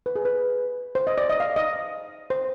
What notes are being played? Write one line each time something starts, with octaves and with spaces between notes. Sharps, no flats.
B4
G#4
B4
C5
D#5
D5
D#5
F5
D#5
C5